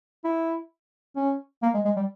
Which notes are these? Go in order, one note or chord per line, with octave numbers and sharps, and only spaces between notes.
E4
C#4
A#3
G#3
G#3
G3